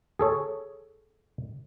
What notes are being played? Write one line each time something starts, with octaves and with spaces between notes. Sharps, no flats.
G#4 A4 C#5